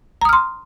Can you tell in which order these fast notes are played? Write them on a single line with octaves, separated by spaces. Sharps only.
A#5 D#6 F6 C6